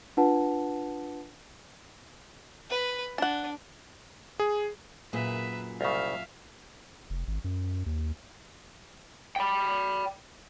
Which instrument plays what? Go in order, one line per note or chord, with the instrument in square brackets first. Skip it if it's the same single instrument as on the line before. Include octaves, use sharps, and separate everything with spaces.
[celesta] D4 F4 B4 F#5 A5
[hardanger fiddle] B4
[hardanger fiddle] D4 [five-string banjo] F#5 A5
[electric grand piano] G#4
[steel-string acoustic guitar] F#2 A#2 G#4 [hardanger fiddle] B4 E5
[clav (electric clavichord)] C2 C#3 [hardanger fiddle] E5 F5
[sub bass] F1
G#1
F#2
D#2
[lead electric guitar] G5 B5